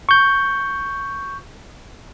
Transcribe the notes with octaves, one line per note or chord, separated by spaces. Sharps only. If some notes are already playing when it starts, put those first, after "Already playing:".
C#6 G6